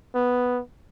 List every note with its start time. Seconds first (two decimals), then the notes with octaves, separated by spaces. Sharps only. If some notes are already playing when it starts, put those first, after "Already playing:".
0.15 B3